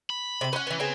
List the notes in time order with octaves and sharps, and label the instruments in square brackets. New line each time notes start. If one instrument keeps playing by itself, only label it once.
[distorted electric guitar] B5
[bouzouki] C3 G4
[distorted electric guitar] C#4 [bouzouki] B4 F#5
[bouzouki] E3 B3
[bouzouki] C#3 B3 G#5 [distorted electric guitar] C4